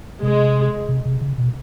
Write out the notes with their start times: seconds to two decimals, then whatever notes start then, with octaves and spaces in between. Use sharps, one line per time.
0.22 C3 G#3
0.89 C3
1.05 C3
1.21 C#3
1.38 B2